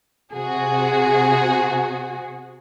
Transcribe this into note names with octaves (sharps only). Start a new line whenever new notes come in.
C3 F#4 G#4